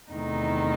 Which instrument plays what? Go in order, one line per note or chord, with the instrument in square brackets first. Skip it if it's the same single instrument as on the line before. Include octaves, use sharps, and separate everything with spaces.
[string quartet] E2 C3 D#3 A3 D#4